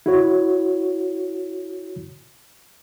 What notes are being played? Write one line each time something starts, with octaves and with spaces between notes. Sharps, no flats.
E4 F#4 C#5